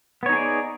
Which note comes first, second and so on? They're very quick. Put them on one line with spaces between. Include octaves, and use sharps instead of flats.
B3 C#5 D#4 G#4 D5